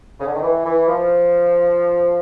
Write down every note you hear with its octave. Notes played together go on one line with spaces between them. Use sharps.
C#3
D3
D#3
E3
E3
F3